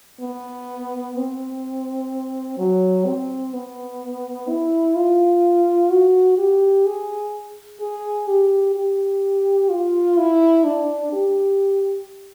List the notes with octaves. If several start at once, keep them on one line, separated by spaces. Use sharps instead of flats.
B3
C4
F#3
C4
B3
E4
F4
F#4
G4
G#4
G#4
G4
G4
F4
E4
D4
G4